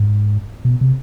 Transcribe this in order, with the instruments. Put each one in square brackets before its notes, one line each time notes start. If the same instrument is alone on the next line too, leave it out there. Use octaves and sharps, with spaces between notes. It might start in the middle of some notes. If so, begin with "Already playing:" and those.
Already playing: [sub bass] G#2
B2
C3